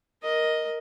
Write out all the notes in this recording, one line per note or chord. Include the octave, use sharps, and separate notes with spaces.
A#4 D#5